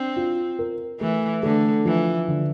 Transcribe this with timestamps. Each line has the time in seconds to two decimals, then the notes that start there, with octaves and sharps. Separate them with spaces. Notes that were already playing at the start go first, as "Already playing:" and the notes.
Already playing: C4 D4
0.16 F4
0.59 A#4
1.00 E3 A3
1.43 D3 A3
1.85 E3 F3
2.28 D3